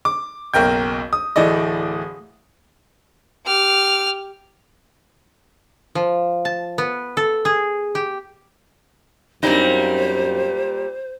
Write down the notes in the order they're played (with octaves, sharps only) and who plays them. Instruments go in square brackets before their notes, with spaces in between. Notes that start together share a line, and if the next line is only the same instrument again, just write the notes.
[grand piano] D6
F#1 B1 A#4 G5 G6
D#6
D1 E3 A3 D5 D#5
[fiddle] G4 F6
[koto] F3
A5
B3
A4
G#4
G4
[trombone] F#2 [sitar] A#2 G3 A#3 [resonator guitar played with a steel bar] C4 D#4 [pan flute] C5